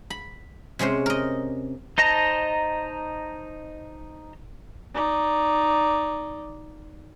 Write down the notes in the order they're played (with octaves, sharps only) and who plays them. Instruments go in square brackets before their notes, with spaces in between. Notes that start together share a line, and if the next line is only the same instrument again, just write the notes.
[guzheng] B5
C3 G#3 C#4 C5
A#4 D#5
[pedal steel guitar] D#4 C5 D#5 A5 A#5
[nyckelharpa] D#4 D5